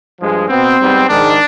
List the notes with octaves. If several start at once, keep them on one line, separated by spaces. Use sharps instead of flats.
G2 F3 G#3
B2 B3 C4
G#2 G3 B3
G#2 D#3 G#3 D4